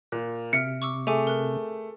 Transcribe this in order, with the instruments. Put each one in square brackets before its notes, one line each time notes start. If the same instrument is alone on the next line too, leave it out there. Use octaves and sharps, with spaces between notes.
[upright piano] A#2 [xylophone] F#6
[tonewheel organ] C3 [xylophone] E5 F6 D7 [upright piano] C#7
[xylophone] C#6 D6 E6
[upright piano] A3 [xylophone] G#4 G#5 D6
[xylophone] A#4 F#6